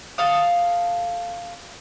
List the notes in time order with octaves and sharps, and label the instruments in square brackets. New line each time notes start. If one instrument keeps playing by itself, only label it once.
[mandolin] A4 F5 D#6